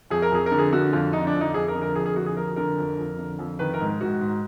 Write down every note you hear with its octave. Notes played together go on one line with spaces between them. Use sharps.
F2 G#4
A#4
F2 G#4
A#4
D3
G#4
D3 F#4
F2 F4
D3 D#4
D4
F2
D#4
F2 G#4
A#4
D3
A#4
F2 G#4
G#4
D3 F#4
G#4
F2 A#4
D3 A#4
F2
F2
D3
F2
D#3 B4
A#4
G#2
G#2 F#4
G#2